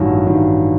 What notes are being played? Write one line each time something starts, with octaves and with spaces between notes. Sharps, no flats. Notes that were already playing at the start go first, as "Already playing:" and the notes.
Already playing: A1 G2 D#3 F#3
A1 G2 D#3 F#3